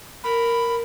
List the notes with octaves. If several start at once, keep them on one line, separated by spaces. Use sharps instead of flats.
A#4 B5